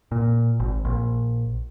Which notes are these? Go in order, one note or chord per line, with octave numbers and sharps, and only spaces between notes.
A#2
G#1
A#1